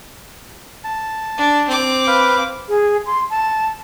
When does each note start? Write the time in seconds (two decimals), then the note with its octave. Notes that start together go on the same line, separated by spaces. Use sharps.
0.84 A5
1.38 D4
1.68 C4 D6
2.07 B4 F5
2.69 G#4
3.06 C6
3.30 A5